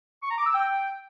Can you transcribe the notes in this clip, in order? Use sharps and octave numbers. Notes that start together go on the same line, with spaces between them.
C#6
A#5
D6
E6
G5